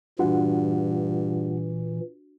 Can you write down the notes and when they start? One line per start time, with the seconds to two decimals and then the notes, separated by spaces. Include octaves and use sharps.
0.19 G2 A#2 E3 D4 F4 F#4 F#5